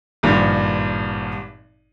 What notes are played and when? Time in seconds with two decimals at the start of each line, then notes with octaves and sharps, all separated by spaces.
0.23 G#1 G2 A#2 F3